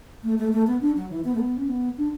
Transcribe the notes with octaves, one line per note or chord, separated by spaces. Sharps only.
A3
A3
A3
B3
D4
F#3
E3
B3
A3
B3
C#4
B3
D4